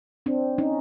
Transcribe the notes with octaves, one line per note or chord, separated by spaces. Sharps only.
C4 D4
C#4 D#4